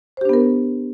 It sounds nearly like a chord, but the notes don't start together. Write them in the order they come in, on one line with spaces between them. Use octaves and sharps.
C5 G4 D4 B3 A#4